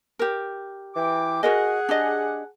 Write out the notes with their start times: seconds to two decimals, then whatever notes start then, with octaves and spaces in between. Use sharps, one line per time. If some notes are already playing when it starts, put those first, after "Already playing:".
0.19 G4 A#4
0.95 E3 G5 D6
1.43 F#4 G#4 A#4 D#5 F#5
1.89 D4 G4 D#5